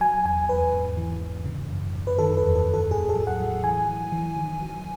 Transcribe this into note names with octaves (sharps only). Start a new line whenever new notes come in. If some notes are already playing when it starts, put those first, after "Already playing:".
F#3 G#5
E2 G#5
E2 B4
G#2
E3
G#2
C#3
F#2
F#2
B4
D#3 A4
B4
E2
A4
E2
A4
A2 G#4
A4
F#3
F#5
F#3
E3 G#5
E3
E3
D#3
F#3